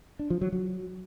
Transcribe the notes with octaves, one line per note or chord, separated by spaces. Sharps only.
D4
F3
F#3
F#3